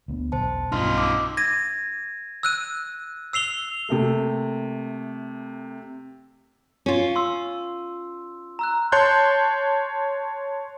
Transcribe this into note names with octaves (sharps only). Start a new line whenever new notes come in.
D2 B3
E1 B1 C5 A5
B1 G2 B2 D#4 F4 C6 F6
D6 E6
G#6 A#6 D#7
E6 F#6 D#7
E6 C7 F7 G7
C3 A3 A#3
C#4 F4
C6 E6
A#5 E6 F#6
C#5 A5 C6 F#6 G6